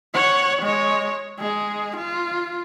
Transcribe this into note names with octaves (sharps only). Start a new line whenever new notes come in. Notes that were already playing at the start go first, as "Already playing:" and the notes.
C#5 F#5
G#3 C#5
G#3 G#4
F4